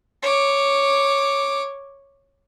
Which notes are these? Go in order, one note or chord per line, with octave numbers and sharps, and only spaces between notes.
C#5 D6